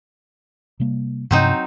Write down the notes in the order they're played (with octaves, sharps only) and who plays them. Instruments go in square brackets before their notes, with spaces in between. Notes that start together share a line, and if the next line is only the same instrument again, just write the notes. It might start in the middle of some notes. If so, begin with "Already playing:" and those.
[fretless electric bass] C3 G3 A#3
[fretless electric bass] G2 C3 F3 [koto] F#3 C4 D#4